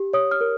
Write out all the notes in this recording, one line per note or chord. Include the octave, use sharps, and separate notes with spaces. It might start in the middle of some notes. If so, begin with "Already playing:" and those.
Already playing: G4
C#5 D#6
F6
A#4